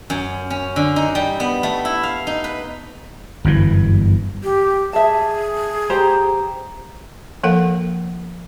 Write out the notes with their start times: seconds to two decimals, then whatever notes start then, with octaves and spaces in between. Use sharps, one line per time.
0.10 F#2
0.50 C#4
0.76 D3
0.96 D#4
1.15 G3
1.40 B3
1.63 A3
1.85 E4
2.03 F5
2.27 D#4
2.44 B4
3.45 G1 F#2 E3
4.43 G4
4.93 G#4 E5 A5
5.90 G4 C5 A#5
7.43 F3 A#3 A4 A#4 F5 F#5